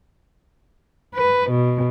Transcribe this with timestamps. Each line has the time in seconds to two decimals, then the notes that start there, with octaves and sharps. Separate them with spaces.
1.15 B4
1.52 B2